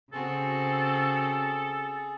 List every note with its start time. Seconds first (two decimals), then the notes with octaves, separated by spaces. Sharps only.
0.13 C#3 C4 F#4 G#4 A4